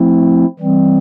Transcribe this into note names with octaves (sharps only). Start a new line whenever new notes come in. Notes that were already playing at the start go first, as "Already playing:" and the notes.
Already playing: F3 A3 C4 E4
E3 G3 C4